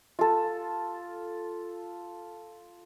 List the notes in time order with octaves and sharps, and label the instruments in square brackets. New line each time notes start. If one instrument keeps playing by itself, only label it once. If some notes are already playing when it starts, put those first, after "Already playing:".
[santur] F4 A4